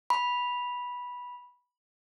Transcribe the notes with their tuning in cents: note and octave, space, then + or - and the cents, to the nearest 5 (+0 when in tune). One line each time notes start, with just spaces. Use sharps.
B5 -10